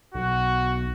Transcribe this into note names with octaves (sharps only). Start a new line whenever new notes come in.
B1 F#4